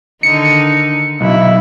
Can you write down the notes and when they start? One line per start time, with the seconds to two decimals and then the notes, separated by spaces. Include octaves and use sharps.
0.23 D3 D#3 D#4 C#7
1.21 B1 E4